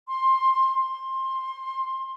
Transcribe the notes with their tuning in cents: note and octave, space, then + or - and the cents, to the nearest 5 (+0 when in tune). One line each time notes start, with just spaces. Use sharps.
C6 +20
C6 +20